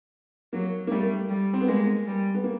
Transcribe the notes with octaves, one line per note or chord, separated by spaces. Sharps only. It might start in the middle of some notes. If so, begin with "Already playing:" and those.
F#3 A#3
A#3
G3 A3
G3
C4
B3
G#3 A#3
G3
B3
A#3